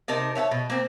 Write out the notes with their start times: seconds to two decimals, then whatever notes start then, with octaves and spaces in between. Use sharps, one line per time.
0.08 C3 D#4 A#4 A5
0.35 C#5 E5 F#5 A5
0.51 B2
0.70 A#3 C4